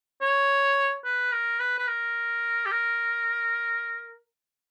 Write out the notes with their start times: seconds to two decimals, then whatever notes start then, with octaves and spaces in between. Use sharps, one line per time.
0.21 C#5
1.05 B4
1.32 A#4
1.60 B4
1.79 B4
1.88 A#4
2.66 G4
2.71 A#4